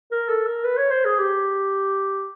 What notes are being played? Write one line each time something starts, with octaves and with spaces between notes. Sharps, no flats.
A#4
A4
A#4
B4
C#5
C5
G#4
G4